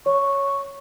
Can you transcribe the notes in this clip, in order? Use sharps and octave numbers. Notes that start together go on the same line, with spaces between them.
C#5 C#6